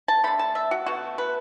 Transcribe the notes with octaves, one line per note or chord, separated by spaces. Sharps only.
A5
D3 A3 B5
A5
E5
F#4
B2 A3 F#4
B4